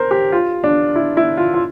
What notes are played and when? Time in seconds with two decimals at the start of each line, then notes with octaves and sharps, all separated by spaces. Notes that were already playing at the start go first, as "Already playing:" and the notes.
Already playing: A#4 C5
0.11 G4
0.32 F4
0.64 D4
0.96 E4
1.17 E4
1.37 F4
1.54 F4